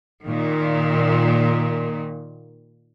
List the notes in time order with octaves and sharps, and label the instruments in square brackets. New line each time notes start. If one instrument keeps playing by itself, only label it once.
[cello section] A#2 D#3